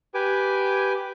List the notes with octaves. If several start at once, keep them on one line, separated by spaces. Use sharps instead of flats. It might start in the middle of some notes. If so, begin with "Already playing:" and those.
G4 B4 G#5 D6